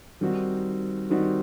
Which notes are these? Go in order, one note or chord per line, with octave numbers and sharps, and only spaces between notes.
D#3 G3 C4 D#4 F#4
D#3 G3 C4 D#4 F#4